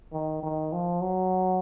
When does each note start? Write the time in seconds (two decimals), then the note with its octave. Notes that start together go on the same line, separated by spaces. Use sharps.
0.13 D#3
0.43 D#3
0.72 F3
1.01 F#3